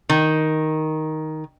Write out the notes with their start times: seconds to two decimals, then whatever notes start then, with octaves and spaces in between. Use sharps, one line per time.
0.09 D#3